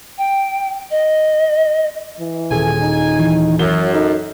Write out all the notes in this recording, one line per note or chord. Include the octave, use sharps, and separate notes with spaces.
G5
D#5
E3
D#1 G#4 A4 G#5
D#4
E3
F#2 F#3 G7
D#4 A4